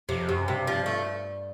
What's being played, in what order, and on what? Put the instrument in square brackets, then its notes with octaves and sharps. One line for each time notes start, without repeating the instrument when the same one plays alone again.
[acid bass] F2 [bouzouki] C3
[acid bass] F#2 [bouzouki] C3
[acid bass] G2 [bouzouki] C3
[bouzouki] F3
A3